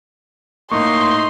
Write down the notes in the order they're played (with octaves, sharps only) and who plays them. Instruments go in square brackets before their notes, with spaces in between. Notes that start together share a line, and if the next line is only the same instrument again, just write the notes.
[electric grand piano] A2 A3 A#3 [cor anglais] D#4 [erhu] C6 [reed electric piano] C#6